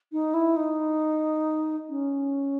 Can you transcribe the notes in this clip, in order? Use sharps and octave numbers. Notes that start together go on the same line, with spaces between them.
D#4
E4
D#4
C#4